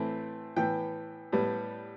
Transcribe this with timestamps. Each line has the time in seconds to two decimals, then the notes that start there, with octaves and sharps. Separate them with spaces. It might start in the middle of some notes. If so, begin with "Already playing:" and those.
Already playing: A2 E3 A3 C4
0.56 A2 E3 B3 G5
1.32 A2 G3 B3